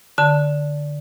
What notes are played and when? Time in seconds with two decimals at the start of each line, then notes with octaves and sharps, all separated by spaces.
0.18 D3 A5